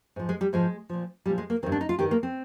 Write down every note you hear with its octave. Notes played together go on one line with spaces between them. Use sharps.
G#2 F3
G#3
G3
G#2 F3 G#3
A#2 F3
A#2 F3 G3
G#3
A#3
G2 D#3 C4
D4
D#4
F4
G2 D#3 G4
A#3
C4